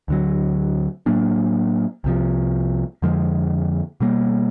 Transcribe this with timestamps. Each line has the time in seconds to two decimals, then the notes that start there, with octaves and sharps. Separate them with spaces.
0.08 D2 D3 F#3
1.06 A2 F#3 A#3 D4
2.04 C2 C3 F3
3.02 F2 D3 F3 G#3
4.01 B2 G3 A#3